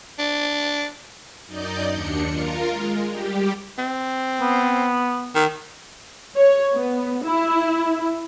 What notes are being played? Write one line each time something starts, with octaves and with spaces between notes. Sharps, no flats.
D4
F#2 D#4 D5 D#5 G6
D#2 D4 C#7
F4 A#4
G#3
G3 G4
C4
B3
D#3
C#5
B3
E4